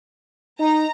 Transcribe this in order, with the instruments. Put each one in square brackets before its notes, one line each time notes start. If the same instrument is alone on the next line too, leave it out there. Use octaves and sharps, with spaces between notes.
[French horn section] D#4 [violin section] A#5